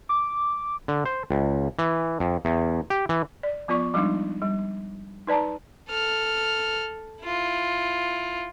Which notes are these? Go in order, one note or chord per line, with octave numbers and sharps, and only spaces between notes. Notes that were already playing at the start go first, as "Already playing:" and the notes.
D6
D3
C5
C#2
E3
F2
E2
G4
E3
D5
F3 B3 F4 D5 C#6
F3 G3 G#3 D4 D#4
G3
D#4 B4 D5 A5 A#5
A4 F6
E4 F4